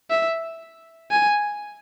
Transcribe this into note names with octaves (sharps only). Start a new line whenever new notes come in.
E5
G#5